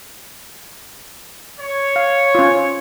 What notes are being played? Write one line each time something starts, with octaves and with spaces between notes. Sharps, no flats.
C#5
F5
C#4 F4